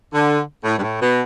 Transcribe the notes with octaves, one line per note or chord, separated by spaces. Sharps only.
D3
A2
G2
A2
B2